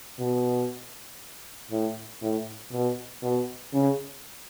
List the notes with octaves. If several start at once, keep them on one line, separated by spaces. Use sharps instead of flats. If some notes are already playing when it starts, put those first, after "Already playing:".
B2
A2
A2
B2
B2
C#3